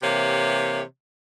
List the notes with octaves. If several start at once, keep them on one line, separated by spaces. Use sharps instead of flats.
C3 E3 A#3 G4 C#5